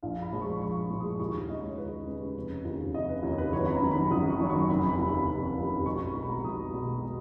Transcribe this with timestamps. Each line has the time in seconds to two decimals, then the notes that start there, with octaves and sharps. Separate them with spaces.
0.03 A#1 F5
0.22 B5
0.32 A#2 F3 G#3
0.41 C#6
0.61 A#1 C#6
0.90 A#2 F3 G#3
1.00 D#6
1.20 D#2 C#6
1.48 C#3 G#3 D#5
1.63 C#5
1.78 D#2 B4
2.07 C#3 G#3
2.35 F1
2.65 D#2 C#3
2.94 F1 D#5
3.09 B4
3.23 D#2 C#5
3.26 C#3
3.38 B4
3.53 G#1 C#5
3.66 B5
3.72 A#5
3.81 F#2 D#3 F#3
3.91 B5
4.11 G#1 D#6
4.30 C#6
4.40 F#2 D#3 F#3
4.50 C#6
4.69 F1 B5
4.89 B5
4.98 D#2 C#3
5.09 B5
5.27 F1
5.57 D#2 C#3
5.86 B1 C#6
6.00 C#6
6.15 B2 G#3 B5
6.30 A#5
6.44 B1 D#6
6.74 B2 G#3